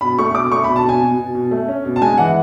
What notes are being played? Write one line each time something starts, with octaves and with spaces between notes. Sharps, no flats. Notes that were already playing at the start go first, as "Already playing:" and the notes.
B2 B5
A3 C#6
B2 D6
A3 C#6
B2 B5
A5
B2 G#5
B2
B2
B2
A3
C#4
B2
A5
G#3 G#5
E3 F#5